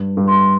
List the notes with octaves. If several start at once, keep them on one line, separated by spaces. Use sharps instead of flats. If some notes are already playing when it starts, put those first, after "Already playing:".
Already playing: G2
G2
C6